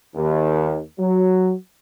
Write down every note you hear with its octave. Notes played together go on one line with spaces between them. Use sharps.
D#2
F#3